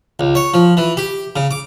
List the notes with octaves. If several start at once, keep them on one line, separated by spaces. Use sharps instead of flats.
C#2
C#5
F3
E3
G4
C#3
D6